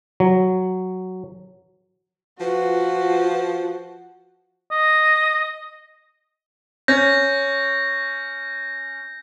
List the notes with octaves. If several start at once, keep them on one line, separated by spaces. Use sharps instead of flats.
F#3
F3 F4 F#4 B4
D#5
C#4 G6 A#6